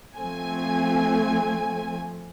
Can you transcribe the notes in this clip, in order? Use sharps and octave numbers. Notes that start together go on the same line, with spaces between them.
F3 A3 C4 G#5